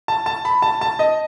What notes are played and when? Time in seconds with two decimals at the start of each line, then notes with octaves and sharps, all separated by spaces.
0.08 A5
0.26 A5
0.45 B5
0.62 A5
0.81 A5
0.99 D#5